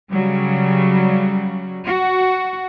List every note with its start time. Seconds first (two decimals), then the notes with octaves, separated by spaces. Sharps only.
0.12 C#3 F#3 G3
1.85 F#4